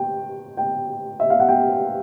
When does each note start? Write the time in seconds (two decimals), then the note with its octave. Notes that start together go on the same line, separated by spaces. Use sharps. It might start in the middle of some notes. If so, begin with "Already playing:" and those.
Already playing: G5
0.57 G5
1.20 E5
1.30 F5
1.40 F#5
1.49 G5